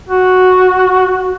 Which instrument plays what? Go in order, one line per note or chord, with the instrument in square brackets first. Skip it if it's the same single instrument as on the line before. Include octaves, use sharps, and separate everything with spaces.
[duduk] F#4